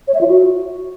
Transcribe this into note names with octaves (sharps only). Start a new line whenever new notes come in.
C#5
E5
F4
F#4